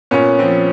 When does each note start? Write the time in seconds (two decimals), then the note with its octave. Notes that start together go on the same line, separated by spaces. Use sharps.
0.11 A#2 B3 C#4
0.39 F3 C4